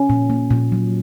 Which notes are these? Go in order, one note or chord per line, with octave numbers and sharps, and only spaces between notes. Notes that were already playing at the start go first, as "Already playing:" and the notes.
Already playing: C#4
A#2
A#3
A#2
F#3